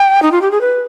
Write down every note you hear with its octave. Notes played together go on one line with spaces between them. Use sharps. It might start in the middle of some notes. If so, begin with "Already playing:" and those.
Already playing: G5
D#4
F4
G4
G#4
B4